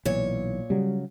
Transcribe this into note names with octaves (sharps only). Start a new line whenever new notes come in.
B1 A#2 E3 C#5
C#3 F#3 G3